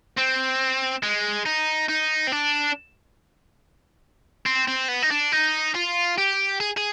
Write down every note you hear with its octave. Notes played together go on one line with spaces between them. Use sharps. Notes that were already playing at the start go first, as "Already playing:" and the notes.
C4
G#3
D#4
D#4
C4
D4
C4
C4
B3
D#4
D4
D#4
F4
G4
G#4
G#4